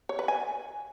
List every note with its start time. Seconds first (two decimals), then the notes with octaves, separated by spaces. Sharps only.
0.09 C#5
0.19 B4
0.28 G#5